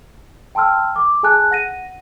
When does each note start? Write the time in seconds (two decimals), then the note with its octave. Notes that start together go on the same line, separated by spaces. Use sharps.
0.55 G5 A5 C6 E6 F6
0.96 D6
1.23 G#4 G#5 A5 F#6
1.51 F#5 A#6 D#7